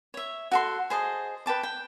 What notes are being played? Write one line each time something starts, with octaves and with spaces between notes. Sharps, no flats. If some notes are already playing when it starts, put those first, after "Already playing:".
C#5 E5
F#4 A4 C6
G#4 C5 D#5 A5
B4 G5 A5 D6
G5